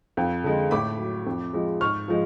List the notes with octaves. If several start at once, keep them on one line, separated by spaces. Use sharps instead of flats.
F2
D3 G#3
A2 B5 D6
F#3
F2
F3 G#3
G#2 C#6 F6
F3 G#3